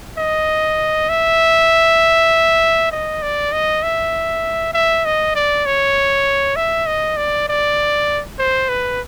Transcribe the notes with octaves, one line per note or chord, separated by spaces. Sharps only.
D#5
E5
D#5
D5
D#5
E5
E5
D#5
D5
C#5
E5
D#5
D5
D5
C5
B4